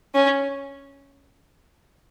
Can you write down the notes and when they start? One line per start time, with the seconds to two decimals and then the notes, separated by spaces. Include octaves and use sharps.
0.15 C#4